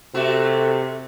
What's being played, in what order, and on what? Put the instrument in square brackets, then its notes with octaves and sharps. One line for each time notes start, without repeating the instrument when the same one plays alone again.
[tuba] C3 [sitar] A3 F#4